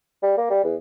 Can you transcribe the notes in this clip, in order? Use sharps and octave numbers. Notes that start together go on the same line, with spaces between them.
G3
A#3
G3
E2